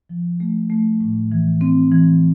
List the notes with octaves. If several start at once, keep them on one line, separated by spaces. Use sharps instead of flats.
F3
A3
A3
A2
E3
C4
E3